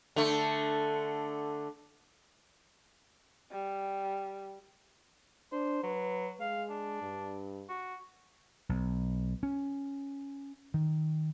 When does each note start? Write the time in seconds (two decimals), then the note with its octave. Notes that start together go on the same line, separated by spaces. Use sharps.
0.16 D3 A3
3.52 G3
5.52 D4 C5
5.83 F#3 B4
6.40 G#3 F5
6.70 D4
7.02 G2
7.69 F#4
8.69 B1
9.43 C#4
10.74 D#3